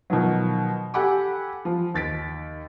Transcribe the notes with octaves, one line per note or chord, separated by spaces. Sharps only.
B2 D#3 F3 F#3
G4 A4 F#5 G#5 B5 D6
F3
D#2 A6 B6 D7